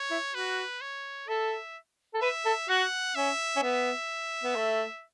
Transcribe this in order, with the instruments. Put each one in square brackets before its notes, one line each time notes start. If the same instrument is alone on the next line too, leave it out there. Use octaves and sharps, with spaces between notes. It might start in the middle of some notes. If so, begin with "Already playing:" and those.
Already playing: [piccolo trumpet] C#5
[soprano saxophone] E4
[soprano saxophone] F#4 [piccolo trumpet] B4
[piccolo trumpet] C#5
[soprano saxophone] A4 [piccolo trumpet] E5
[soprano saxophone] A4
[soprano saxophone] B4 [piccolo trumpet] E5
[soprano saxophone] A4
[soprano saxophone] F#4 [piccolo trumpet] F#5
[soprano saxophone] C#4 [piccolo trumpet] E5
[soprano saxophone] C#4
[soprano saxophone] B3 [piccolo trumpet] E5
[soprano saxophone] B3
A3